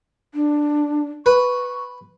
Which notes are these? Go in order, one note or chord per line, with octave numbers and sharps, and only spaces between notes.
D4
B4 C#6